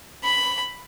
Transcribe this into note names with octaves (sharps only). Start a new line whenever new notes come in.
B5